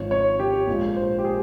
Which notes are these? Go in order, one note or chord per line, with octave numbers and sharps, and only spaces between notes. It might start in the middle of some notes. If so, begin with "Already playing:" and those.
Already playing: G#1 G#2 F3 C4 C#5
C#5
G4
A#1 A#2 F3 G#3
C5
G4
G#4